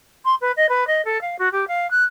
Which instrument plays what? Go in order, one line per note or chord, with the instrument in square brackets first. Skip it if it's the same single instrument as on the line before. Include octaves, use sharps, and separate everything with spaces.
[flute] C6
B4
D#5
B4
D#5
A4
F5
F#4
G4
F5
F#6